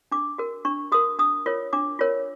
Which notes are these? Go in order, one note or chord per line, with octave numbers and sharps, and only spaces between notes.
D4 D6
F#4 A#4
D4 C#6
F#4 A#4 D#6
D4 D#6
F4 A#4 C#5
D4 D6
F4 A#4 C#5